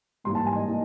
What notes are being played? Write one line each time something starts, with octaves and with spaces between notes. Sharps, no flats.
G#2 E3 G3 A#3 C6
A5
G#5
D#5
E3 G3 A#3